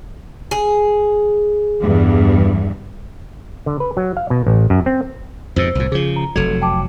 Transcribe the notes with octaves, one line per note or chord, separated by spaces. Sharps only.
G#4
E2 G2
D3
B4
F#3
F5
B2
A1
F#2
C4
F2 G#2 B2 C5 E6
C2 A2
C#3 F3 G#4
A#5
F1 F#3 A4 G#6 F7
G5 A5 D6